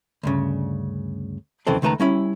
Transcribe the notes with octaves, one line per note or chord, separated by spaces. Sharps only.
D2 G2 C#3
C2 F2 C#3 E3 C4 A4
C#2 D#3 A3 B4 A5 A#5
G3 C#4 E4